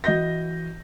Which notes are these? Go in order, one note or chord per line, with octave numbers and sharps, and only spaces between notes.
E3 F#4 D#5 G6 A#6